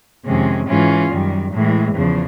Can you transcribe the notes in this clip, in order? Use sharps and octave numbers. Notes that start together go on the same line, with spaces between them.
F2 C3 D#3 G#3 C#4
G#2 E3 G#3 C#4 F4
F#2 D#3 G3
A2 E3 G#3
E2 C#3 F3